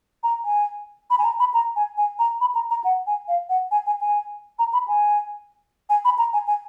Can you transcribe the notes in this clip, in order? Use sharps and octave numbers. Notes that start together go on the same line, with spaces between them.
A#5
G#5
B5
G#5
A#5
B5
A#5
G#5
G#5
A#5
B5
A#5
A#5
F#5
G#5
F5
F#5
G#5
G#5
G#5
A#5
B5
G#5
G#5
B5
A#5
G#5
G#5